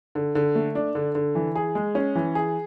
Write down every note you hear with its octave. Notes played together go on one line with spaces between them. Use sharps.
D3
D3
A3
D4
D3
D3
E3
G#4
G#3
C#4
E3
G#4